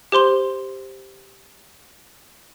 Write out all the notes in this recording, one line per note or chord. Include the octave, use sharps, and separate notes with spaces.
G4 C5 C6 G7